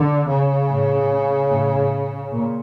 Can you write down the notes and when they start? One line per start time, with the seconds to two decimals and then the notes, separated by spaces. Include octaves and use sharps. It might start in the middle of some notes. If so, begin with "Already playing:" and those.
Already playing: D3
0.27 C#3
0.68 A2
1.50 A2
2.32 A#2